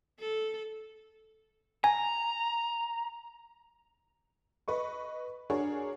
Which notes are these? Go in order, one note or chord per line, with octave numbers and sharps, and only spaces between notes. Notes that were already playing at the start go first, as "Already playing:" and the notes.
A4
G#5 A#5
B4 D#5 C#6
D4 F#4 G#4 A#4 C#5